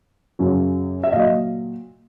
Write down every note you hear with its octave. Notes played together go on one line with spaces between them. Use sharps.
F#2 C#3 F#3
E5
A#2 F#3 D#5 F5